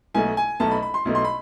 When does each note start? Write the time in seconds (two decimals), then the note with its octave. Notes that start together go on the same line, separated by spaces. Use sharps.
0.14 B1 B2 A3 G#5
0.37 G#5
0.60 B1 B2 A3 A5
0.71 B5
0.83 B5
0.94 C6
1.05 B1 B2 A3
1.15 C6
1.24 B5